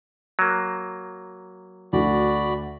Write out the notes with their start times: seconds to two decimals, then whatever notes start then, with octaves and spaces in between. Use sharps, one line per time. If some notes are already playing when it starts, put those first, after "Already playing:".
0.39 F#3 A#3
1.93 D2 F#4 D5 B5